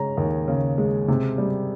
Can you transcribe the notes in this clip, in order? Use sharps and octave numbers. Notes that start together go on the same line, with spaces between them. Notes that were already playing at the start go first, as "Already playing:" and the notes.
Already playing: C#3 G#3 C#4 A#5
D#2
C#3
G#3
C3
G3